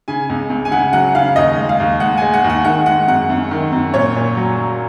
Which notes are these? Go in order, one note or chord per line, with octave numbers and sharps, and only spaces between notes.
C#3 G#5
C#2
C#2
G#5
C#3 F#5
F#3 F#5
C#3 F5
D#2 D#5
G#3
F5
D#2
G#3 F#5
G#5
G#3
F#5
D#2
F#5
D#3 F#5
G#3 F#5
F#2 F#5
F#2
D#3
F#2
A#2 C#5
A#2
F#3
F#3